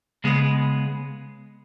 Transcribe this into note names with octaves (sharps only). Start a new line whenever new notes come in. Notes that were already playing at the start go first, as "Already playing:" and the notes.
C#3 G#3 B3 G#4